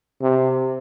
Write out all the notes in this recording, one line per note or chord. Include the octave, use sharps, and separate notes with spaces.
C3